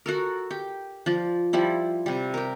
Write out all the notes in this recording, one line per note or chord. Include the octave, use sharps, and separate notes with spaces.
F#4 A4 A#4
G4
F3 D5
F3 G3 E4
C3 G3
G4 A#4